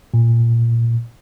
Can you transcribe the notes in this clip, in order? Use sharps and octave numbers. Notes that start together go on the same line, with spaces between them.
A#2